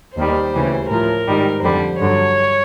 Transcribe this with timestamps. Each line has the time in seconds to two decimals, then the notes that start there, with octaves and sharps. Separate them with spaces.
0.17 D#2 D#3 G3 C5
0.53 D2 C#3 E3 G3
0.90 A2 F3 A#4
1.27 G#2 D#3 G3
1.63 F2 D3 G3 C5
1.99 G2 D3 F#3 C#5